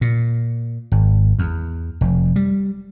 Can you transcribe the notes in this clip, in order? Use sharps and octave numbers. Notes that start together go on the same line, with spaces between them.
A#2
G#1
E2
F1
G3